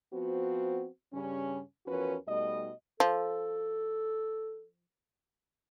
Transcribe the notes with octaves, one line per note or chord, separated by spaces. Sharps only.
F3 B3 C4 F#4
G2 C#3 G3 C#4
E2 F3 C#4 F#4 A#4 B4
B2 G3 A3 D#4 D#5
F3 A4